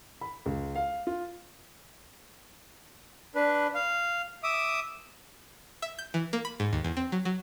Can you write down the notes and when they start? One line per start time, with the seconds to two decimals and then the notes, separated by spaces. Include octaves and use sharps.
0.21 B5
0.46 C#2
0.75 F5
1.07 F4
3.35 D4 B4
3.75 F5
4.43 E5 D6 D#6
5.82 E5
5.99 G6
6.14 E3
6.33 A#3
6.45 B5
6.60 G#2
6.73 D#2
6.84 E2
6.97 C4
7.12 F#3
7.25 F#3